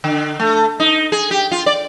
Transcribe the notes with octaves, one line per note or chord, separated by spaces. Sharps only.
D3
A3
D#4
G#4
G4
F4
D5